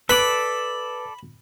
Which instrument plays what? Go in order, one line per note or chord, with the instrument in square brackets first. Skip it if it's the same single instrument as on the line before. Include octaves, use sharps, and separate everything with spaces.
[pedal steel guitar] A4 D5 [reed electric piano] B4 D6 [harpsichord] B5